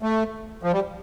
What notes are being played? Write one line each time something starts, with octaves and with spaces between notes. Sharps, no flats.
A3
F3
G3